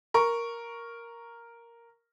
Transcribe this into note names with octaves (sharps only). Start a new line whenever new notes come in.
A#4 C#6